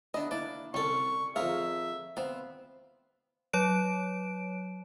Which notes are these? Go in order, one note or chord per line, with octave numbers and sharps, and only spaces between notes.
B3 D4 E4 D#5
A#3 D4 E4 D5
C2 G3 C#4 A4 C#6
F2 G#4 A#4 C5 E5 F5
B3 C4 F5
F#3 C#5 D7